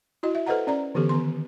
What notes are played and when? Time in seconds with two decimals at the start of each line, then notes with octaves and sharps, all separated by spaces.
0.23 E4 F#4 D#5
0.35 E5
0.46 A4 B4 C5 D#5 F#5 A#5
0.67 C#4 D5 A#5
0.95 D3 E3 B3 G4 A4
1.09 D#3 B3 C6